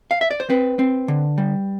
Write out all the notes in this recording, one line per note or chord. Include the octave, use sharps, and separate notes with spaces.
F5
E5
D5
C5
C4 B4
C4
D3
G3